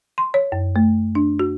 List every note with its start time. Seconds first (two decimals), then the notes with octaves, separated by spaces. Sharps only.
0.18 C6
0.34 C#5
0.52 F#2
0.76 A3
1.15 D4
1.39 F#4